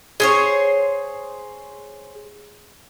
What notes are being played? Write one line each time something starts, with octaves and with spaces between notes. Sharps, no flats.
G#4 C5 C#5